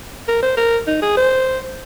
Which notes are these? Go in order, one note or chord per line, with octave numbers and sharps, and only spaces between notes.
A#4
C5
A#4
D#4
G#4
C5